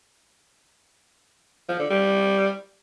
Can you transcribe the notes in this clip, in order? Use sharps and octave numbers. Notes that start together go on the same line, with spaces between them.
F3
D3
G3